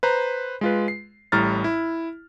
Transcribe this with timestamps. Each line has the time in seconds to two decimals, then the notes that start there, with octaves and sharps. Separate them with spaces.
0.03 B4 C5 A#5
0.61 G#3 F4 B4
0.88 C7
1.32 A1 A2 G3 A#5 F6 A6
1.64 E4